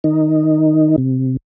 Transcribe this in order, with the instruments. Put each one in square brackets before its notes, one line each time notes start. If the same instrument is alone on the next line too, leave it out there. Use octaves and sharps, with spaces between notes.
[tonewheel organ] D#3 D#4
C3